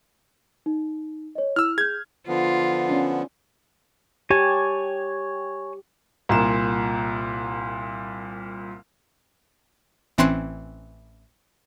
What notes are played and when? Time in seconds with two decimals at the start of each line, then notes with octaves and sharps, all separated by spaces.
0.66 D#4
1.35 C#5 D#5
1.56 E4 E6 F6
1.78 G#4 G6 G#6
2.28 D3 F3 B3 F4
2.89 C#4 D4
4.31 G4 C#5 G#5 A5
6.29 C2 A#2 E7
10.18 A1 E3 C4 C#4 C6 F#6